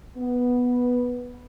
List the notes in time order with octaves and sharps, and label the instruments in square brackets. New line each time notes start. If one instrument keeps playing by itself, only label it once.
[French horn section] B3